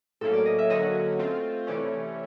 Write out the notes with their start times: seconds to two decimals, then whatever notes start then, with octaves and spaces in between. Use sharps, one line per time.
0.21 A2 F#3 A#3 C#4 A4
0.33 D5
0.45 D#5
0.59 E5
0.70 D3 F#3 A#3 C#4 F#4 D#5
1.19 A3 C4 F4
1.67 C3 E3 A3 C#4 D5